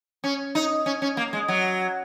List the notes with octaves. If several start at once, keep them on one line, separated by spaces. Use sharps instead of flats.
C#4
D#4
C#4
C#4
A#3
G#3
F#3